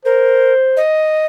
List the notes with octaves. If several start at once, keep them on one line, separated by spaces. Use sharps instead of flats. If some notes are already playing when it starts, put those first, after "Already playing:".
A#4 C5
D#5